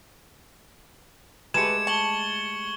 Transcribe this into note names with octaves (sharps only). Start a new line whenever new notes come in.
G#3 A3 G4 B4 G#6 C#7 E7
A5 C#6 F#7 G7